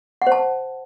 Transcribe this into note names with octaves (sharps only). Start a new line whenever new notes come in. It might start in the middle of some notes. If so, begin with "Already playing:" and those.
F#5
C5
A5